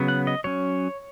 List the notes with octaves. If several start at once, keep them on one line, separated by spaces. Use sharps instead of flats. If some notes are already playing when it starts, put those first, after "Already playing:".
Already playing: C#3 F#3 B3
F#5
D#5
F#3 C#4 C#5